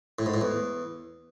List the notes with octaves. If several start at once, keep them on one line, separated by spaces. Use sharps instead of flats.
A2
G#2
A2
E2